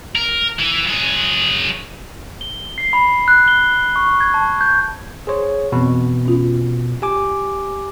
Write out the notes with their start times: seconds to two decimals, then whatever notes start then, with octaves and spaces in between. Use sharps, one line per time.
0.15 A#4
0.59 E3
0.87 F#3 G#4
2.41 G7
2.78 C7
2.93 B5
3.28 F#6
3.48 G7
3.96 C#6
4.20 G#6
4.34 A5
4.61 G6
5.27 G#4 C5 C#5 C6 G#6
5.72 F2 B2 E3 C4
6.25 C#4 F4
7.02 G4 G#5 D6